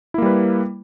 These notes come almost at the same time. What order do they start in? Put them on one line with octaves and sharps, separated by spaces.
E4 A#3 G3 B4